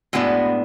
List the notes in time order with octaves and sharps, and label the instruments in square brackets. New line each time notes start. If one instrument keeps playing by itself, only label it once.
[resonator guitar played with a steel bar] A2 G#3 B3 D4 F#4